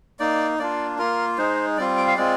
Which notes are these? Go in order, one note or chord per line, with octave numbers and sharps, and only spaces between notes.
A#3 D#4 D5
A#3 D4 F4 D5
A#3 F4 A#4
G#3 D#4 C5
G3 C4 F4 D5
G5
F5
G#3 C4 F4 D5